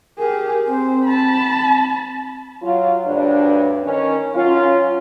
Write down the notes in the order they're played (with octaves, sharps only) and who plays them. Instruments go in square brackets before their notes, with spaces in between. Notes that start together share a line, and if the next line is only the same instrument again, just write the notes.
[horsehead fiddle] G4 G#4 [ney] A#4
[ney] C4 [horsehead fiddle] C5
[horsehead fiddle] A5 B5
[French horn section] F#3 F4
D2 G2 D4 B4 C#5
D#3 C#4
F#3 C#4 F4